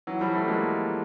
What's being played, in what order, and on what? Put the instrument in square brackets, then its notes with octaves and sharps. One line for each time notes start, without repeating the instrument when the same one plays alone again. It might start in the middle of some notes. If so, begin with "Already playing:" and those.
[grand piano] E3 F#3
F3 G3
G3 A3
G#3 A#3